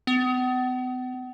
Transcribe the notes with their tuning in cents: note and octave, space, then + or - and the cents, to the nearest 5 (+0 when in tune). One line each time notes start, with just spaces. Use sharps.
B3 +40